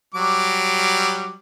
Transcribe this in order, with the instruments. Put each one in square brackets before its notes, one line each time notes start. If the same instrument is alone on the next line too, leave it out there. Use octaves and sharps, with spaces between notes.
[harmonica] F#3 G3 D6